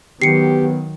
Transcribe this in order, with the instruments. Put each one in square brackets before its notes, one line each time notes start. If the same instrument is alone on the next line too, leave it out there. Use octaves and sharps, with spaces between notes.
[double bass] D#3 F#3 [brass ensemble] B3 [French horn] G4 [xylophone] C7 C#7